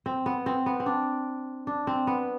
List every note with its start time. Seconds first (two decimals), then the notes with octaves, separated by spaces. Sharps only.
0.06 C4
0.26 B3
0.46 C4
0.66 B3
0.80 C4
0.86 D4
1.67 D4
1.87 C4
2.07 B3